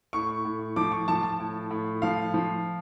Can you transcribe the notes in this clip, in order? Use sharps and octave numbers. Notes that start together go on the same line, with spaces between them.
A2 C#6
A2
F3 D6
C#6
F3 A5
A5
A2
A2
F3 F5
F3